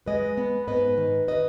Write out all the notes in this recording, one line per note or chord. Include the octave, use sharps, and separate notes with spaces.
G#3 B4 D#5
B3
G#2 B4 D#5
D#3
B4 D#5